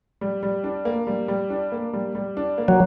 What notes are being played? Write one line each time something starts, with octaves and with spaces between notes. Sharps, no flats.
G3
G3
D4
A#3
G3
G3
D4
A#3
G3
G3
D4
A#3
F#3